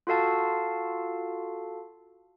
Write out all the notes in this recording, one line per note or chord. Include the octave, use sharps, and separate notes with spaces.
F4 F#4 A4 F5 A5